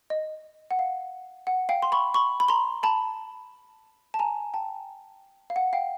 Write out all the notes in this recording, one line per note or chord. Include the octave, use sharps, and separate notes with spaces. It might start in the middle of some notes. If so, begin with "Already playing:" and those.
D#5
F#5
F5
F#5
F5 G5
C6
B5 C#6
B5 C#6
B5
A#5 C6
A5 B5
A5
G#5 A#5
G5 A5
F5
F#5
F5 G5